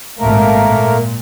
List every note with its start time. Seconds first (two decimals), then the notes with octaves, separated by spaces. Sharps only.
0.19 G#1 A#2 A3 A#3 A#4
0.62 A#2